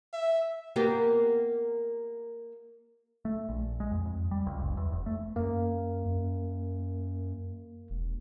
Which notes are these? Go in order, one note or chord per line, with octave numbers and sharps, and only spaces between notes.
E5
A#3 B3 G4
A3
A#1
G#3
F2
F2
G3
C#2
F#1
E2
F1
A3
F#2 A#3
F#2
E1